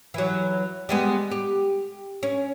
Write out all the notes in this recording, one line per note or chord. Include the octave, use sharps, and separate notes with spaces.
E3 F#3
G3 G#3 B3
G4
C#4